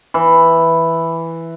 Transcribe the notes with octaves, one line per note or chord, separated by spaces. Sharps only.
E3